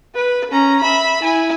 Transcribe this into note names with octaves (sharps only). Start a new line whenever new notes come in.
B4
C#4 A#5
E5 B5
E4 G#5